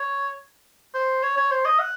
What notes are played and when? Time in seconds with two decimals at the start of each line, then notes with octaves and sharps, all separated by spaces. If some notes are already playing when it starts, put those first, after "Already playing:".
Already playing: C#5
0.94 C5
1.23 C#5
1.37 C#5
1.51 C5
1.65 D#5
1.79 F#5